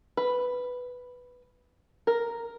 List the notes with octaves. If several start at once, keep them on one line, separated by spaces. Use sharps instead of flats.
B4
A#4